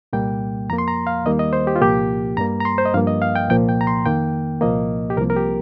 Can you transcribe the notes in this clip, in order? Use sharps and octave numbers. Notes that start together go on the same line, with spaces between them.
C2 A#2 G3 A#3 G5
F2 F3 A#3 A#5
C6
A#5
F5
D#2 D#3 G3 A#3 D#5
D#5
C5
G4
F4
C2 A#2 F3 A#3 G4
G2 G3 A#3 A#5
A#5
C6
C5
D#5
G2 F3 A#3 F5
D#5
F5
G5
C2 A#2 F3 A#3 G5
G5
A#5
C6
F2 D#3 A#3 G5
C2 A#2 F3 A#3 D#5
G4
C2 C3 F3 A#3 A#4
A#4
G4